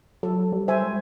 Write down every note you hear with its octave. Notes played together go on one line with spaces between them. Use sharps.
F#3 A4
G3
C5 E5 G#5
G#3